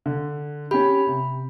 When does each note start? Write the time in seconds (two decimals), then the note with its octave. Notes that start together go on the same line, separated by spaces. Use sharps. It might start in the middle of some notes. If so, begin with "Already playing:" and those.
0.06 D3
0.71 C#4 G4 B5
1.07 C3